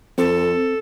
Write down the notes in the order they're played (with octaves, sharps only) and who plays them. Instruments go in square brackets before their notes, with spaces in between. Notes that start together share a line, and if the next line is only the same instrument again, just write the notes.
[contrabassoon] F2 [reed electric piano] C4 [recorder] A4